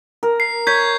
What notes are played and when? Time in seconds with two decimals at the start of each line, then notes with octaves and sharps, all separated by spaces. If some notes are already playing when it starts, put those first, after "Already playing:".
0.23 A#4
0.40 C7
0.67 C#5 G6 G#6 B6